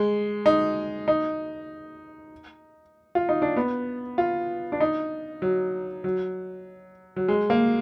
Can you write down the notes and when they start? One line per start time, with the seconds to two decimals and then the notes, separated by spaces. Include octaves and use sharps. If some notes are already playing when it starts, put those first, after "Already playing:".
Already playing: G#3
0.46 D#4
1.08 D#4
3.15 F4
3.29 D#4
3.42 D4
3.56 B3
4.18 F4
4.72 D4
4.80 D#4
5.42 F#3
6.04 F#3
7.16 F#3
7.28 G#3
7.50 A#3